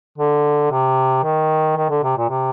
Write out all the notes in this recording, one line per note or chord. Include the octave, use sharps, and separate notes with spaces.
D3
C3
D#3
D#3
D3
C3
A#2
C3